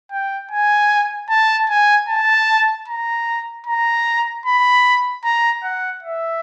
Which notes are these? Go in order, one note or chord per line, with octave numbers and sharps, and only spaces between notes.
G5
G#5
A5
G#5
A5
A#5
A#5
B5
A#5
F#5
E5